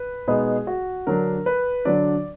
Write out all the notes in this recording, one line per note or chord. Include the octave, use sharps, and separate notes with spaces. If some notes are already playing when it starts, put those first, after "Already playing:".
Already playing: B4
B2 G#3 B3 D#4 G#4
F#4
D3 F#3 D4 A#4
B4
D3 F#3 D4 D5